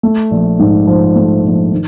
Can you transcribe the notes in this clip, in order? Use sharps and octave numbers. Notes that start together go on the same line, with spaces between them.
A3
A#1
G#2
F3
A3
A#1
D#3